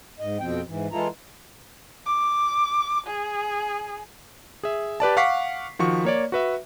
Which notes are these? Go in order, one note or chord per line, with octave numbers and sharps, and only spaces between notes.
G#2 D#5
F2 B2 F3 C4 G5
G#2 E3
E3 G#3 E4 F4 A4 A#5
D6
G#4
G#4 E5
G4 B4 D5 A5
F5 F#5 C#6 D6 B6 C7
D#3 F3 F#4 C#6
A#3 C#5 D5
F#4 B4 E5